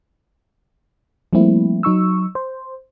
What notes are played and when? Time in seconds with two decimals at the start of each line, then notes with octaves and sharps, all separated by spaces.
1.33 F3 G3 A3 A#3 C4 E4
1.83 F#3 D#4 C#6 E6
2.35 C5